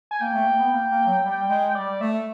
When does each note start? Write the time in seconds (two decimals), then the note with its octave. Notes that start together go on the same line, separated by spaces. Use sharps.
0.11 G#5
0.21 A#3 G5
0.34 A3
0.46 A#3
0.59 B3
0.72 A#3
0.90 A#3
1.06 F#3
1.23 G3
1.49 G#3
1.75 G3 D5
2.00 A3 E5